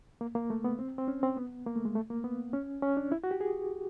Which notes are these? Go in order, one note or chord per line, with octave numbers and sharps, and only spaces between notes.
A#3
A#3
A3
B3
C4
C4
C#4
C4
B3
A#3
A3
G#3
A3
A#3
B3
C#4
C#4
D4
E4
F#4
G4
G#4